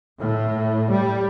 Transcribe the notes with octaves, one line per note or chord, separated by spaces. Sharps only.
A2
G3